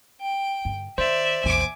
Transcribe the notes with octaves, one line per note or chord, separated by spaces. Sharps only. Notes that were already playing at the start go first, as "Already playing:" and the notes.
G5
G2 D3
D#3 C5 D5 E5
A#1 E2 G#5 D6